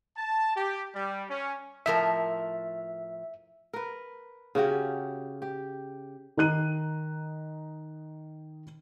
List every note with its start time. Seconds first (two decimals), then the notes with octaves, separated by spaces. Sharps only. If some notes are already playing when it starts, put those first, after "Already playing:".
0.17 A5
0.57 G4
0.95 G3
1.30 C#4
1.86 A2 F3 A#4 E5
3.73 A#4 B4
4.55 C#3 C#4 F#4 G4
5.42 G4
6.37 D#3 D#4 F#6 D#7